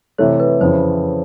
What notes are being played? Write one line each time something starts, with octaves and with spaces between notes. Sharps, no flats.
C3 E3 A3 C#5
B4
F2 C#3 E3 C5